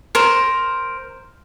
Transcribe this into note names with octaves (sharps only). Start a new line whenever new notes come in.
A#4 C5